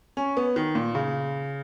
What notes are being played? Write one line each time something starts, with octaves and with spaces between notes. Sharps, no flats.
C#4
B3
D#3
A#2
C#3